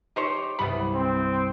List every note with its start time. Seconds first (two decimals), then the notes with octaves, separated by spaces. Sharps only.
0.16 D#4 G4 C5 C#5
0.59 C2 G2 B3 B5
0.94 C4